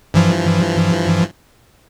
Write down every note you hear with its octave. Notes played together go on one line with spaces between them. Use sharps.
G2 E3 F3